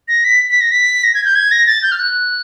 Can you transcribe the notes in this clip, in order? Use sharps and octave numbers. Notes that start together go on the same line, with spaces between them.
A#6
B6
B6
A#6
B6
A#6
G#6
G6
G#6
A#6
A6
G6
F6
F#6